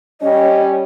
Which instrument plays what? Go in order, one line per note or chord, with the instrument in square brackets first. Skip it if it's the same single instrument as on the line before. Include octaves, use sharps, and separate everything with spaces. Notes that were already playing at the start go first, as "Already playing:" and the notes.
[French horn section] G3 C#4 [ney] D#5